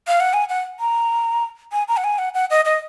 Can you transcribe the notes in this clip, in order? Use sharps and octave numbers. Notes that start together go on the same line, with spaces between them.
F5
F#5
G#5
F#5
A#5
G#5
A#5
F#5
G#5
F#5
F#5
D#5
D#5